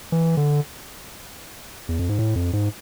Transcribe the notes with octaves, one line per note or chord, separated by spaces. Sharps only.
E3
D3
E2
F2
G#2
A2
F2
G#2